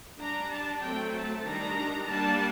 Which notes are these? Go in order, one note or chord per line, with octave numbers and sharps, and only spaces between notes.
G3 D4 A#5
A5
F#3 A3 C4 G5
A5
D#3 G3 D4 A#5
G3 A#3 D4 A5